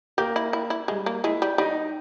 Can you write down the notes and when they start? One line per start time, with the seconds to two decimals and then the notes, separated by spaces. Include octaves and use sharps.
0.18 A#3 G4
0.36 E4
0.53 E4
0.70 E4
0.88 G3 G#3
1.06 A#3
1.24 G#3 E4
1.42 G3
1.58 G3 D#4